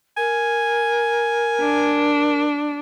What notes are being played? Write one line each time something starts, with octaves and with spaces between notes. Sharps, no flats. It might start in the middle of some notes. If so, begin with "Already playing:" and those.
A#4 G#5
D4